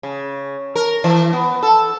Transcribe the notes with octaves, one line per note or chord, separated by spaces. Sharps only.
C#3
A#4
E3
B3
A4